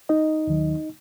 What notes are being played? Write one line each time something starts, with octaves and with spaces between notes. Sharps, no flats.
D#4 D#5
D#2 D#3 F#3